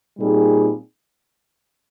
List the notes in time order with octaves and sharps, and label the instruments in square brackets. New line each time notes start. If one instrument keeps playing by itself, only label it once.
[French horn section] A#2 G3 C4 D#4 G#4